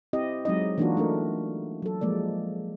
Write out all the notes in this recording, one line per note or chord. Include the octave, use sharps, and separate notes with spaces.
C4 E4 G4 D#5
F#3 G#3 C4 D#4 D#5
E3 A#3 D4 D#4 F4 F#4
A3 D4 A#4
F#3 A4
F3 G#3 A#3 D5